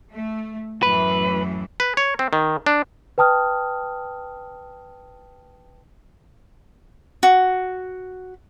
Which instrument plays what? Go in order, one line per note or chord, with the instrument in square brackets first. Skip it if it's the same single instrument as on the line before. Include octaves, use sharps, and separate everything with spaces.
[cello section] A3
[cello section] F#2 A2 E3 [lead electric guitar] B4
[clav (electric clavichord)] B4
C#5
C4
D#3
D4
[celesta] B4 G5 A5 D#6 F6
[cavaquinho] F#4